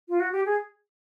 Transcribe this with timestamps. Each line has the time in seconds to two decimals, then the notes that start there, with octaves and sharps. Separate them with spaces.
0.09 F4
0.20 F#4
0.32 G4
0.46 G#4